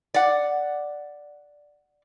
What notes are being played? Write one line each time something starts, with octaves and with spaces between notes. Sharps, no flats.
D5 F#5